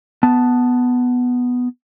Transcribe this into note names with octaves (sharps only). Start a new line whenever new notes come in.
B3 A5